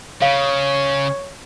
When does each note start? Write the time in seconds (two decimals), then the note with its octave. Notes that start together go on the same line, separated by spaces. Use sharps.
0.22 C#3 C#5 F5